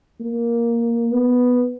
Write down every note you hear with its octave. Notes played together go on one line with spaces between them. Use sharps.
A#3
B3